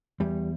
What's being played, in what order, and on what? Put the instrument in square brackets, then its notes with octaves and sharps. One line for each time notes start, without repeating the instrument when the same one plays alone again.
[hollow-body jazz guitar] E2 G3